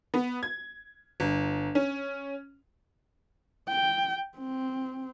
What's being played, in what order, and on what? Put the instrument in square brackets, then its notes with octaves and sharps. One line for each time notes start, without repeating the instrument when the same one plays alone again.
[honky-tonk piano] B3
G#6
G1
C#4
[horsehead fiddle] G5
C4